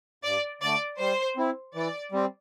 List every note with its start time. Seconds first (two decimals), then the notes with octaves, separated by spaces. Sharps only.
0.24 G2 D5
0.62 D3 A3 D5
0.99 G3 C5
1.37 C4 E4
1.75 E3 D5
2.12 G3 C4